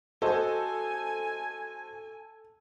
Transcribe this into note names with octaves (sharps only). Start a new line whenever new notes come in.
F#4 A4 C5 D#5 G#5